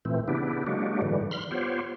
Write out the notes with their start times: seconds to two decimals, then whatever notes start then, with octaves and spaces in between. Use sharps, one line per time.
0.05 A#2 E3 A3 C4
0.28 C#3 B3 D4 E4 G4
0.67 F#3 G#3 A#3 D4 F#4 G4
1.02 G#2 D3 E3 G3
1.31 B5 C6 F6
1.51 B3 F4 G4 C5 C#5